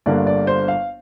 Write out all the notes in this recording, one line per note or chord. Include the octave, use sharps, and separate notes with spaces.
G1 G2 D3 A#3 D5
D5
C5
F5